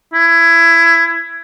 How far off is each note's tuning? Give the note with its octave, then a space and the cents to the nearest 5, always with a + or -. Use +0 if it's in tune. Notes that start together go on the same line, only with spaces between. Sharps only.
E4 +20